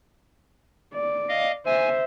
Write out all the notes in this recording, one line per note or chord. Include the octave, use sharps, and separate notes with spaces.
D5
D#5 F5
C5 E5 G#5